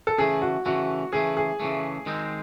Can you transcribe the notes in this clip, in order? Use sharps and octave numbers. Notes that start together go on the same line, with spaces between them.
A4
C#3 E3 A3 G#4
F#4
C#3 E3 A3 F#4
C#3 E3 A3 G#4
G#4
C#3 E3 A3
D#3 G#3 C4 D#4